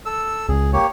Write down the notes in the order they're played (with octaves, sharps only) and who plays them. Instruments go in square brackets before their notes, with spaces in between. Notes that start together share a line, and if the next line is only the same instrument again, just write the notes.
[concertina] A4 E6
[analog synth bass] C#2 [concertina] G#4
[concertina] A#3 G4 C#5